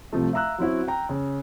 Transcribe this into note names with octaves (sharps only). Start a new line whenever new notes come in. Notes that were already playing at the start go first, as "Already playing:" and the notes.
C2 C3 F3 A3
E5 F5 A#5 E6 F#6
F#3 C4 C#4 E4 F#4
G5 A#5
C#3